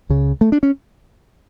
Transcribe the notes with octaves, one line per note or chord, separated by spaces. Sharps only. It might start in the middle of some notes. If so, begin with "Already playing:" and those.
C#2 C#3
A3
D4
C#4